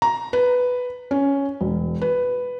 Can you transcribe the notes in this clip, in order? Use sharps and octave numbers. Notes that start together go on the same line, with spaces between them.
A#5
B4
C#4
E1
B4